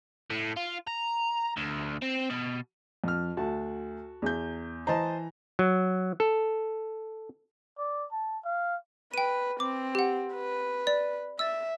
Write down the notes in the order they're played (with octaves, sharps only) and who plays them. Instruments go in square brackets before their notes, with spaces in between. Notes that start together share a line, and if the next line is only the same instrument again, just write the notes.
[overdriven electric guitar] A2
F4
A#5
D2
C4
B2
[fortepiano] F2 F6
[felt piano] D2 [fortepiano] F#4 A5
[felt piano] E2 G6
[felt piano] E3 A#5 [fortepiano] C5 D#5 A5
[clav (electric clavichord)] F#3
A4
[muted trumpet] D5
A5
F5
[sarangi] B4 [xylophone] G5 D#7
[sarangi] C4 [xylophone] D6
[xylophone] G4 F#5
[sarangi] B4
[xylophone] D5
[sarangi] E5 [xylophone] E6 A6